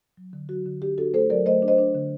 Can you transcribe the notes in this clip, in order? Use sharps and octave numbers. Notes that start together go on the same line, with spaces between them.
F#3
D3
F#3 F#4
D3
D4 G4
D4 F#4 A4
A3 A4 C5
F#3 A#4 D5
A3 C5 D#5
D4
C5 D#5
D4
D3